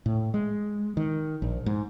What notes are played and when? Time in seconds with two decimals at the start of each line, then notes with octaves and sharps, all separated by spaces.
0.06 A2
0.34 G#3
0.97 D#3
1.42 A#1
1.66 G#2